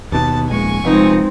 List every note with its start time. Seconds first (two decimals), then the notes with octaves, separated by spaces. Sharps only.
0.12 D#2 B2 B3 A5
0.49 D#1 A#1 G#3 G#5 C#6
0.84 F1 F2 G#3 C4 D#4 B4